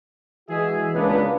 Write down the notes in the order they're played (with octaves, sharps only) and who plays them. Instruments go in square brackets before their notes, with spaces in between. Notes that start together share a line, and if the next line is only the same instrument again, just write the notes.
[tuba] E3 [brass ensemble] G#3 F#4 E5 [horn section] G#4
[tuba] C#2 [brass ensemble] A#3 B3 [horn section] D4 B4